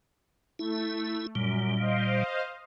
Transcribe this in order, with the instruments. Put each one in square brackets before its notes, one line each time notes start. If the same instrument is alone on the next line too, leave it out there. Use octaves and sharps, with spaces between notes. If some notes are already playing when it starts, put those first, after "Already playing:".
[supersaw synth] A3 [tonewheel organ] E4
[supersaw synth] F#2 [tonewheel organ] A#2 G3
[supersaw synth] C5 D#5 F5